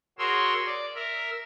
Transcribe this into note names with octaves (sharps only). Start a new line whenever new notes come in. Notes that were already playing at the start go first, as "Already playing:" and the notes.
F#4 G#4 A#4 C#5 C6 E6
D5
A#4 E5